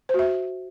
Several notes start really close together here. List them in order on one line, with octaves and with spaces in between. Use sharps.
C5 F#4 E5